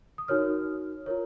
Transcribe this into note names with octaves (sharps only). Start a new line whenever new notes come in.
D#6
D#4 F#4 A#4 C#5 F6
F4 A#4 C#5